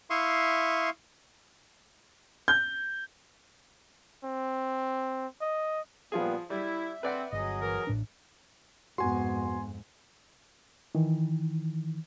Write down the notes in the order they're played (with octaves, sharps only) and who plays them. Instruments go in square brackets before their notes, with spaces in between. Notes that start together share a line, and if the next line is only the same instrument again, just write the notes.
[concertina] E4 E5 F5 C6 C#6 D#6
[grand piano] G6
[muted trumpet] C4
D#5
[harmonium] A#2 G3 B3 [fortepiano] F3 F4 G#4
[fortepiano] G3 [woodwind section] E4 [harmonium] E5
[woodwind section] C4 [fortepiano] B4 D5 F#5
[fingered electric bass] G1 [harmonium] F#3 G#4 [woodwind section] D#5
[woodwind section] E3 A#4
[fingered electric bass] A1 A2 D4
[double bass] F2 G#2 [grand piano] B3 F#4 [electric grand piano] G#5 C6
[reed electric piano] D#3 E3